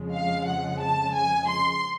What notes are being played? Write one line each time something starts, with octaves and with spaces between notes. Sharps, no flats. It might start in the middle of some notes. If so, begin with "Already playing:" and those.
Already playing: F2 C#3 F3 G#3
F5
F#5
A5
G#5
C6